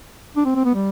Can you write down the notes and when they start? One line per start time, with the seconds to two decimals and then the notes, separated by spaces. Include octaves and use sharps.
0.36 D4
0.45 C4
0.56 C4
0.65 B3
0.75 G3